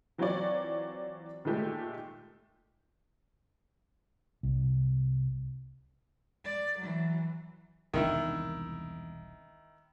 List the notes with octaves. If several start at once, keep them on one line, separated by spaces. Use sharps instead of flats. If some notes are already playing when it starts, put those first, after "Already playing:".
E3 F#3 C4 F4 C#5 D5
A#2 D#3 G#3 A3 G4
C2
D5
E3 F#3
E1 C2 D#3 D4 E4